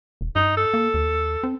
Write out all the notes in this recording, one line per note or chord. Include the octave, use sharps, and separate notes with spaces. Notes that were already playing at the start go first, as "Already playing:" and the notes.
E1
G2 D#4
A4
A#3
D#2
C4